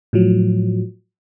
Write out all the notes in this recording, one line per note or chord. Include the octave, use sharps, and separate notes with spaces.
A2 F3 F#3